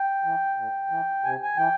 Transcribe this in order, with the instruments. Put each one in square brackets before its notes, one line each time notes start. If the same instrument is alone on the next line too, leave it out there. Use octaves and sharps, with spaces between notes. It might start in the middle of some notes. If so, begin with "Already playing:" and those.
Already playing: [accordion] G5
E3
A2
E3
C3 G#5
G#5
E3 G5